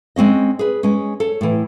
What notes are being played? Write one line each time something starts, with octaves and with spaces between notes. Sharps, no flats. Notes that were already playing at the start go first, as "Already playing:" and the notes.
G#3 C4 C#4 D#5
G#4 B4
G#3 C#4
A4 C#5
A2 E3